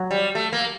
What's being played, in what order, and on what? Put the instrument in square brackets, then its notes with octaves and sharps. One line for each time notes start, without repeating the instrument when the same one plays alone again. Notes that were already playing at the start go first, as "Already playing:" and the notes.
Already playing: [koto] F#3
[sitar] G3
A3
A#3